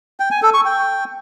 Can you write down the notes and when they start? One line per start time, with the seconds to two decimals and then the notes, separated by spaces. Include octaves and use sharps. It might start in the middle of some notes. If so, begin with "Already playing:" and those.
0.20 G5
0.31 G#5
0.42 A4
0.54 C#6
0.65 G5